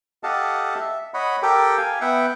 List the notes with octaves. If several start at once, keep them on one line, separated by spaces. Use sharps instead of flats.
G4 A4 D#5 F5 F#5 A5
E5
C#5 D#5 F#5 B5
G4 A4 A#4 G5
F5 G#5
B3 E5 F#5 G5